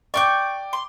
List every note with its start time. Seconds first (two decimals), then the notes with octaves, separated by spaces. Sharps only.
0.14 D5 G5 C#6 D6 F6 G6
0.73 C6